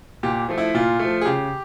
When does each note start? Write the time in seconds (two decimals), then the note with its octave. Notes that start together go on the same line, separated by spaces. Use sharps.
0.23 A#2 G4
0.49 F3 A3
0.58 E4
0.75 A#2 F4
1.00 F3 A3
1.21 G#4
1.26 C#3 G4